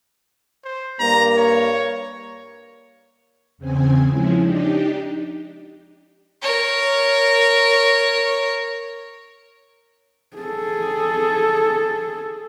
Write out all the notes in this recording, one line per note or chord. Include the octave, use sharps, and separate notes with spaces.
C5
G2 A#3 A#5
C#5
E2 C#3 C4 G#5
F3 G#3 C#4 E4
D4 D#4 G4
A#4 C#5
G#4 A4